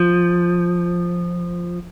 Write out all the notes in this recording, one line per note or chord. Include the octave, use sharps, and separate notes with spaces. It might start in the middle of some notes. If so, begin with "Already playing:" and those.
Already playing: F3